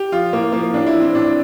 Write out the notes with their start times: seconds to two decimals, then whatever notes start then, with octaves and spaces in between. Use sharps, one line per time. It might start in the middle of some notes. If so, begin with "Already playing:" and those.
Already playing: G4
0.12 F3 F4
0.33 A2 A#3
0.53 F3 A#3
0.73 A2 D4
0.86 E4
0.93 E3
1.00 C4
1.14 A2 D4